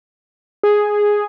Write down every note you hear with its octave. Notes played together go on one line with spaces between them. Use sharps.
G#4